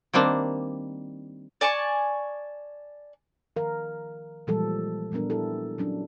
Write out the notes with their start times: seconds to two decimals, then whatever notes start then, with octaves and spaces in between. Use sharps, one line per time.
0.13 D#3 G3 A#3 C4 D4
1.61 D5 G#5 A5 C#6
3.56 D#3 F3 A#4 F5
4.47 A#2 E3 F3 G3 G#3 A4
5.12 A#2 G3 B3 D4 A#4
5.30 A#2 E4 G4 A4
5.78 F#3 C#4 D4